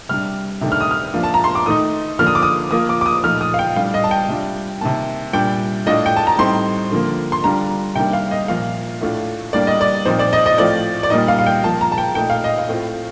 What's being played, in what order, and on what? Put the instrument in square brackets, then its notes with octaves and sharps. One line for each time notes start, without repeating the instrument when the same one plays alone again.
[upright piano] C3 G3 D4 F6
C3 D#3 A3 D4
F6
D#6
F6
F3 A#3 D4 F4
A5
A#5
C6
D6
D#3 A3 D#4 D#6
D3 F3 A#3 D4 F6
D#6
D6
D#6
F3 A#3 F4 D#6
D6
D6
D#6
A#2 F3 A3 D#4 F6
D#6
F5
G5
A2 G3 D4 F4 F5
D#5
A5
G5
C3 G3 D4 F4
C3 D#3 A#3 A5
A#2 G3 D4 G5
A2 A3 D4 F4 D#5
G5
A5
A#5
A2 G3 C4 D#4 C6
D3 F3 A#3
C6
D3 G3 D4 F4 A#5
C3 D#3 G3 A#3 D4 G5
F5
D#5
A#2 F3 A#3 F4 F5
A2 A3 D4 F4
A2 G3 A#3 D4 D5
D#5
D5
A#2 F3 C4 D#4 C5
D5
D#5
D#5
A2 F3 A3 C4 F4 D5
D5
A#2 G3 A#3 D#4 D#5
F5
F5
G5
F3 A#3 F4 A5
A#5
A5
G5
A#2 A3 D#4 G5
F5
D#5
F5
A2 A3 C4 F4